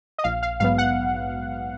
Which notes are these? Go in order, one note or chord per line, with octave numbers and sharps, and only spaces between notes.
D#5
A#1 F5
F5
G#2 F#3 B3 F5
F#5